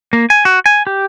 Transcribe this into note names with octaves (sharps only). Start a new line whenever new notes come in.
A#3
G#5
F#4
G#5
G4